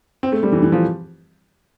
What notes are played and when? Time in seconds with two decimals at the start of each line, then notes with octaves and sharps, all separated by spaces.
0.23 C4
0.32 A3
0.43 G3
0.52 E3
0.63 E3
0.72 F3